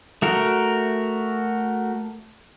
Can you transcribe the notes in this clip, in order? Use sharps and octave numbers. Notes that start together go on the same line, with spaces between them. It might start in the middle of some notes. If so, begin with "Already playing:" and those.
A3 F#4 A#4